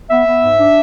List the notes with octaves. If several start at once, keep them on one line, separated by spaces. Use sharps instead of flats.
B3 E5
B3
G#2
D4